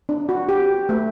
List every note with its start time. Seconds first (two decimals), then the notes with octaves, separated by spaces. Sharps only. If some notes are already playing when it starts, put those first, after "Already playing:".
0.09 D4
0.29 F#4
0.49 G4
0.89 A3